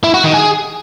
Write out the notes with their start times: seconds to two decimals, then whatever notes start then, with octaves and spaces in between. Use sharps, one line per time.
0.04 E4
0.14 F#4
0.24 D#3
0.34 G#4